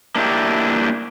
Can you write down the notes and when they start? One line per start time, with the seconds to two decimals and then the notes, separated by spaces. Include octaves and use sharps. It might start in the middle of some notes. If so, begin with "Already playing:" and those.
0.16 A#3 D4 E4 G4